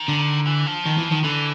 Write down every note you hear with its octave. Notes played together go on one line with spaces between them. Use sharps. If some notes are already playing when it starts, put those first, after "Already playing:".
Already playing: D#3
D3
E3
F3
D#3
E3
D#3
D3 E3